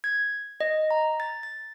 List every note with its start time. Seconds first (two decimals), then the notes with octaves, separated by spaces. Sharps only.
0.04 G#6
0.60 D#5
0.91 A#5
1.20 A6
1.43 A6